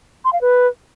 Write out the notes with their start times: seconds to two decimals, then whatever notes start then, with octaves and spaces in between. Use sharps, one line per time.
0.25 C6
0.33 F5
0.41 B4